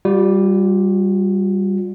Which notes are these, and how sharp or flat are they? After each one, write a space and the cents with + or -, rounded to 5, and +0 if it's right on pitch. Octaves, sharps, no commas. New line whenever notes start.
G3 +0 F4 +40